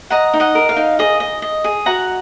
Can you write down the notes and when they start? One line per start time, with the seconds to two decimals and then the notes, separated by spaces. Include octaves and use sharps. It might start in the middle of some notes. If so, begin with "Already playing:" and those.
0.10 D#5 F#5 A#5
0.34 D#4
0.40 D#5 F#5
0.55 A#4
0.69 F5
0.76 D#4
0.99 G#4 D#5
1.20 D#5
1.42 D#5
1.64 G#4
1.86 F#4 F#5 A#5